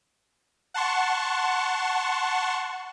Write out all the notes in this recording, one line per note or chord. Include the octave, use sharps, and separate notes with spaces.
F#5 A5 C6 C#6